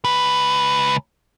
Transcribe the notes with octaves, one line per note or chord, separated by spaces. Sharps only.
C#2 B4